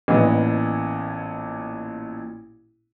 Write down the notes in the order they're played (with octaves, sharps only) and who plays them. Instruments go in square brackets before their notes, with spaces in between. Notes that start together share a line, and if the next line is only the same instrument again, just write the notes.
[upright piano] A1 A#2 B3 D4 D#5